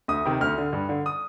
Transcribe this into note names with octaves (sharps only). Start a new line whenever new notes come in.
D2 D#6
C3 D#3
D2 F6
D3
G2
D3
D#6